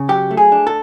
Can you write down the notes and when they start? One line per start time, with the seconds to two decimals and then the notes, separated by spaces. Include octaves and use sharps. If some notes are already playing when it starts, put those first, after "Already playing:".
Already playing: C#3
0.09 F#3 G4
0.31 A3
0.37 G#4
0.52 D4
0.67 A4